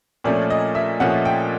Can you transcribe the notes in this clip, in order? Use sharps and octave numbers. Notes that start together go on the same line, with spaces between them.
A#2 F3 A3 C#4 D5
D#5
E5
A#2 F3 A3 C#4 F#5
G5